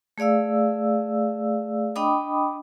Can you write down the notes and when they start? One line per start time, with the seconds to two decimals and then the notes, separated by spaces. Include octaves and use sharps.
0.18 A3 G#4 D5 F5 E6
1.96 D4 D#5 G5 B5 D6 D#6